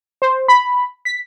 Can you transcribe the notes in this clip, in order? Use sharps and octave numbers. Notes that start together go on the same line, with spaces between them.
C5
B5
B6